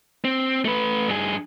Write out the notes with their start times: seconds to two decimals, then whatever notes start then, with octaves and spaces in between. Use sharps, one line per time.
0.25 C4
0.65 A3 B4
1.08 G2 G#4